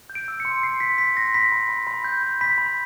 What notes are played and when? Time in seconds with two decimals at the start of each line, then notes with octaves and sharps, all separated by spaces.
0.10 G6
0.15 D7
0.28 E6
0.40 C#7
0.45 C6
0.63 C6 C7
0.80 C6 B6
0.98 C6 B6
1.16 C6 A#6
1.34 B5 B6
1.52 B5
1.69 B5
1.87 B5
2.04 G6
2.23 B5
2.41 B5 B6
2.58 B5